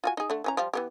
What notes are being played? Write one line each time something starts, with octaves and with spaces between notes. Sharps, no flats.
F4 F#4 G#5
D#4 G#4
D3 A3
E3 C#4 A#5
F3 G3 F4
E3 B3 G4